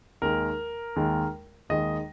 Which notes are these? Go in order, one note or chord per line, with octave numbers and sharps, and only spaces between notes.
D#2 D#3 G#3 A#4
D#2 D#3 G#3
D#2 D#3 G#3 D#5